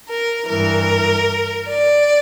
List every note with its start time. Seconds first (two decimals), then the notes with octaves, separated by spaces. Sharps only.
0.09 A#4
0.49 G2 E3 A#4
1.69 D5